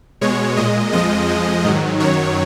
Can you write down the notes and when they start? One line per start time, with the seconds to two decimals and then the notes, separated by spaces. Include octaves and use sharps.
0.21 B2 G#3 C#5
0.57 A#2 G#3 D#5
0.93 F2 F3 G#3 D#5
1.28 F2 F3 G#3
1.64 G#2 D#3 F#3
2.00 F#2 D#3 F#3 C#5